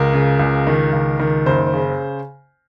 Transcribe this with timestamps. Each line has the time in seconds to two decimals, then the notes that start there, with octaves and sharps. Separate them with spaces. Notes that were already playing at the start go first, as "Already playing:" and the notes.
Already playing: C#2 A#4
0.13 C#3
0.39 C#2
0.67 D#3
0.92 C#2
1.19 D#3
1.46 F#1 C5
1.74 C#3